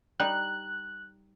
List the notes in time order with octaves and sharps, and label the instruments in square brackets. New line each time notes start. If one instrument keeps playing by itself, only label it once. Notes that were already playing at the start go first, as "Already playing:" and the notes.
[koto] G3 D#4 [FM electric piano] F#6